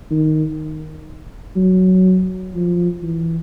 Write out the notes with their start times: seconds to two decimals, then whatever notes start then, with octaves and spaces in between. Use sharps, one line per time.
0.11 D#3
1.56 F#3
2.54 F3
3.03 E3